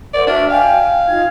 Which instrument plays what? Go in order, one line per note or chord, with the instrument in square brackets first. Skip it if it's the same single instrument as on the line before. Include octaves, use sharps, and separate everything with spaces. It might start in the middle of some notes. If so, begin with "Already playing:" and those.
[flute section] A#4 C5 F#5 [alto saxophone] D5
[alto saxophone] D4 [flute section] F#4 E5 F6
[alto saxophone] F5 [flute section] G5 G#5
[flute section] D#4 F4 G#6